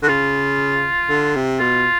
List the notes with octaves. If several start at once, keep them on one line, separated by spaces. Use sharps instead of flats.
D3 F#4
C#3 F4
D3
C3
B2 F4